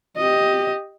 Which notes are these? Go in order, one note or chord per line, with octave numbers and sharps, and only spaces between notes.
G4 D#5